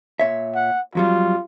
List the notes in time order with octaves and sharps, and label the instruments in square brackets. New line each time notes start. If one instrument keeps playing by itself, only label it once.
[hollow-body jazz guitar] A#2 C#5 E5
[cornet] F#5
[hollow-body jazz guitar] F2 F#3 G3 [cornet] F4